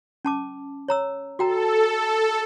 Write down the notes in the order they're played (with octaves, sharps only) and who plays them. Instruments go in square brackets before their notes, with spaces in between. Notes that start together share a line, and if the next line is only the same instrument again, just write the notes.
[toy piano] C#4 A5 D6
C#5 A#5 E6
[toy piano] F#4 G5 A#5 [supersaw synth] A4